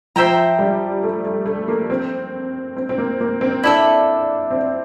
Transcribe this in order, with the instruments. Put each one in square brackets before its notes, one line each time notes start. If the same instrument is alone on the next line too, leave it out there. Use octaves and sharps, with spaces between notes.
[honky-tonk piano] F3 [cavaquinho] C5 E5 G5 A#5
[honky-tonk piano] G3
A3
A3
A3
A#3
C4
C4
C4
A#3
A#3
C4
[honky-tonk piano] D4 [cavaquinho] E4 A4 E5
[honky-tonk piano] C4